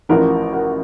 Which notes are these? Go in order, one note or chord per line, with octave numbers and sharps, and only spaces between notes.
A1 A2 F3 F#4 A#4
F#4 A#4